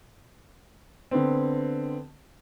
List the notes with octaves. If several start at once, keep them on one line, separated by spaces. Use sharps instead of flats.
D3 B3 C4